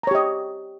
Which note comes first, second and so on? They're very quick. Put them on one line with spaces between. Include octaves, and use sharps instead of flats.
A#5 C#5 G4 D#5